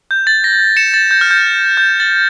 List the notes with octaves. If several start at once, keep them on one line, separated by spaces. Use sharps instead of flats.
G6
A6
A#6
C#7 E7
A6
G6
F6
G6
G6
A6